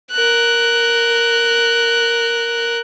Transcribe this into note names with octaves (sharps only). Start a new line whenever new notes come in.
A#4 F#6